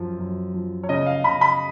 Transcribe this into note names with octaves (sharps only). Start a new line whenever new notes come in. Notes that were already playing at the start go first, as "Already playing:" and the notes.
Already playing: F#2 F3
F#2
F3
C#5
C#3 D#5
F5
C#3 B5
B5